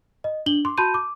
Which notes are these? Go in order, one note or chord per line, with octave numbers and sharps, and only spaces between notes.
D#5
D4 F#7 G7
C6 D6
F#4 A5 B5 C6 G6 D#7
D6